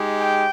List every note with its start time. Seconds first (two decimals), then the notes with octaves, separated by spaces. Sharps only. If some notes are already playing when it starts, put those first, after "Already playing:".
Already playing: G#3 D#4 G4
0.21 G5